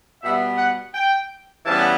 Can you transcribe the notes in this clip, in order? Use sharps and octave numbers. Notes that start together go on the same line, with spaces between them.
B2 G3 B3 E5
F#5
G5
C#3 E3 G3 B3 A5